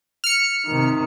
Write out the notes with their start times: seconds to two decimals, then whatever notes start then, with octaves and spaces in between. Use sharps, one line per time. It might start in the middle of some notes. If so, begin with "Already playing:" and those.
0.24 F6 C#7
0.67 C3 D#3